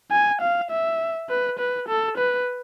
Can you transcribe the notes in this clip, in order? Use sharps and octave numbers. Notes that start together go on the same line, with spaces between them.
G#5
F5
E5
B4
B4
A4
B4